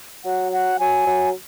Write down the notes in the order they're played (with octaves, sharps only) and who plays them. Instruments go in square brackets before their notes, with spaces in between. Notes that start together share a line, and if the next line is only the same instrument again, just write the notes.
[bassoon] F#3 [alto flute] F#5
[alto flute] F#5
[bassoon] F#3 [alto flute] G#5
[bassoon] F#3